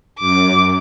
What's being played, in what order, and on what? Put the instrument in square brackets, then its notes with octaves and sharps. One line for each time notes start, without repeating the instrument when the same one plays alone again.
[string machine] F#2 [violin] D6